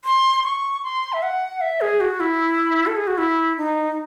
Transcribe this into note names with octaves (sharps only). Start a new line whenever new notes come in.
C6
C#6
C6
E5
F#5
E5
G#4
F#4
E4
A4
G#4
F#4
E4
D#4